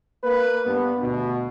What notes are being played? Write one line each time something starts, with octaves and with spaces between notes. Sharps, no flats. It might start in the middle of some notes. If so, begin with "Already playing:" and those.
A#3 B4
G2 B3
D2 B2